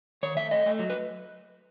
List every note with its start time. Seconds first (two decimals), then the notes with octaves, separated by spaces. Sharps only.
0.23 D#3 C#5
0.37 A3 E5
0.51 A3 D#5
0.66 A3
0.79 F#3
0.90 B4